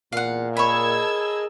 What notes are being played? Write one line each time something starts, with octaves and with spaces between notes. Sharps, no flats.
E2 A#2 F5 F#5
G#4 A#4 C#5 D#5 A5 B5 E6 G#6